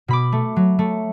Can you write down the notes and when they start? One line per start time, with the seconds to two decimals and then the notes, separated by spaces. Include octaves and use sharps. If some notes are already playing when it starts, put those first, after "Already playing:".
0.08 B2 B5 D6
0.32 A3
0.56 F#3
0.79 A3